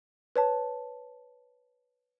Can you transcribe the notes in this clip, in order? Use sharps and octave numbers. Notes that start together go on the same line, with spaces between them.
B4 C#5 A5